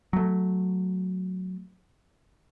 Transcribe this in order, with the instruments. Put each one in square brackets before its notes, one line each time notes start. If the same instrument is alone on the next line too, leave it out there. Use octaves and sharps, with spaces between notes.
[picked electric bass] F#3 A3